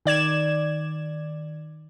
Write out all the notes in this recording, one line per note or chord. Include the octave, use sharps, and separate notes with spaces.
D#3 D5 G#6 E7